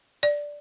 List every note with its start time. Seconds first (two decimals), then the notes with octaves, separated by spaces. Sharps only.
0.23 D5